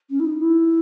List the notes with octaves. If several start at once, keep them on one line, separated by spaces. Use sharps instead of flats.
C#4
E4
D#4
E4